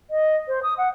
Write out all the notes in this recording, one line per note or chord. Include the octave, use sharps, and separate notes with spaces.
D#5
C5
D#6
F#5